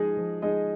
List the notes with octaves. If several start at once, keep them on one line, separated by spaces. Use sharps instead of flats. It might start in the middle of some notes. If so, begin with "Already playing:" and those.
Already playing: F3 G#3 D#4 G#4 D#5
F3
G#3 D#4 G#4 D#5